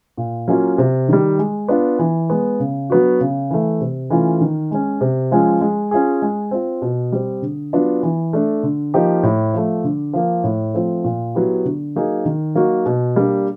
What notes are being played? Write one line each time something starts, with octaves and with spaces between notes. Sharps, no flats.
A#2
F#3 A#3 C#4 F4
C3
D#3 G3
G#3
B3 D4 F4
E3
G#3 B3
C#3
F#3 B3 D4 F#4
C#3
E3 A3
C3
E3 A3 C#4 F4
D#3
G#3 C#4
C3
F3 G#3 C#4 F4
G#3
C#4 F4 G#4
G#3
C4 F4
B2
G3 C4
D3
F#3 B3 D4 F4
E3
A3 D4
D3
F3 A#3 D#4 G4
A2
F3 A3
D3
F3 A#3
A2
F3 A3 C4 F4
A#2
F#3 B3 E4 G4
D3
F#3 A#3 D#4 G#4
D#3
F#3 A#3 D#4 F#4
B2
G3 A#3 D4